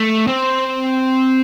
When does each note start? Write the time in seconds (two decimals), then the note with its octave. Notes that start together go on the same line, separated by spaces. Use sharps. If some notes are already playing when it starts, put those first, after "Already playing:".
Already playing: A3
0.27 C4